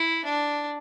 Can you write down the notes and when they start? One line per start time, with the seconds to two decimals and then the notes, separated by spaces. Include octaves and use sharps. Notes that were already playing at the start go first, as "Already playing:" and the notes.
Already playing: E4
0.25 D4